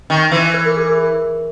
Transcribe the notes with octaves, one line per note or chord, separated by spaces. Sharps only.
D#3
E3
B4
A#4
G#4
A#4